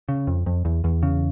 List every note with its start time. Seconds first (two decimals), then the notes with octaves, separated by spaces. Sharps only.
0.09 C#3
0.27 F2
0.46 F2
0.65 E2
0.84 E2
1.03 C#3